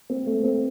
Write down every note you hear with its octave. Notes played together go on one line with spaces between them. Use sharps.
C4
A3
C4